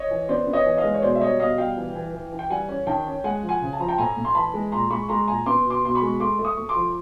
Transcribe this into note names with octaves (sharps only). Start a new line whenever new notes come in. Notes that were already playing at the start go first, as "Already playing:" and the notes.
Already playing: C#5 D#5
E3
B3 C5 D5
B3
C#5 D#5
E3
D#5 F5
G#3
C#5
B2 C5 D5
E5
G3 C#5 D#5
B2 D#5 F5
G3 F5 G5
E3
E3
E3
E3
G5
G3 F#5 G#5
C#4
D#3 G5 A5
C#4
G#3 F#5 G#5
F3
F#5 G#5
C#3
A5
F3 A#5
G5 A5
A2 G#5 A#5
A2
C6
E3 A5 B5
G#3
A#2 A#5 C6
G#3 B5 C#6
G#3 A#5 C6
A#2 G#5 A#5
B3 C6 D6
B2
C6 D6
B2 C6
B5 C#6
G#3
A3 C6 D6
A3
C#6 D#6
A3
C6 D6
F3